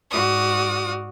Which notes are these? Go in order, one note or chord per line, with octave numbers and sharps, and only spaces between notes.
G#2 F#4 D5 D#6 F6